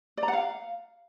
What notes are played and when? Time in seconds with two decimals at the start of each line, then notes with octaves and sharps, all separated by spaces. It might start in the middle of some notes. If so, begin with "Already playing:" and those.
0.17 D5
0.23 A#5
0.28 F#5
0.33 F5